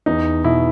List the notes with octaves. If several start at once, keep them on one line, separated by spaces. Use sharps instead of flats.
E2 D#4
B2 E4